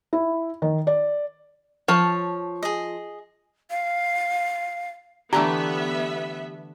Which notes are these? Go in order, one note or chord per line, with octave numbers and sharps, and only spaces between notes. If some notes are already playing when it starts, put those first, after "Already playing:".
E4
D#3
D5
F3 C#5 A5
G#4 D#5
F5
D3 E3 A3 B3 G4 E5 A#5